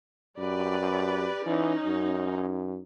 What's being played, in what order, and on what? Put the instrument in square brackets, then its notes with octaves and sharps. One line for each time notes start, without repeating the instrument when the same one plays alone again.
[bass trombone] F#2 [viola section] G4 B4 D5
[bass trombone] E3 [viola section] C#4 D#4
[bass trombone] F#2